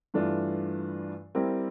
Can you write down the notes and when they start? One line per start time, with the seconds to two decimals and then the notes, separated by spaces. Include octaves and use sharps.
0.14 G2 E3 A3 D4 F4
1.35 G3 C4 E4 G4 A#4